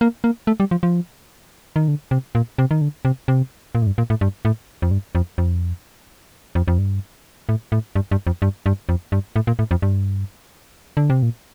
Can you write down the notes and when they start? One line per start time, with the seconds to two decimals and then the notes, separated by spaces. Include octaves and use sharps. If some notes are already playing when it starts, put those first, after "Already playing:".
0.01 A#3
0.24 A#3
0.47 A3
0.60 G3
0.71 F3
0.83 F3
1.76 D#3
1.88 D3
2.11 C3
2.35 A#2
2.58 C3
2.71 D#3
2.81 D3
3.05 C3
3.28 C3
3.75 A#2
3.82 A2
3.87 G2
3.98 A#2
4.10 A2
4.21 G2
4.45 A2
4.82 F2
4.91 G2
5.15 F2
5.38 F2
6.55 F2
6.68 F2
6.79 G2
7.49 A2
7.72 A2
7.96 G2
8.11 G2
8.27 F2
8.42 G2
8.66 G2
8.89 F2
9.12 G2
9.36 A2
9.47 A#2
9.59 A2
9.71 F2
9.82 G2
10.97 D3
11.10 C3
11.22 A#2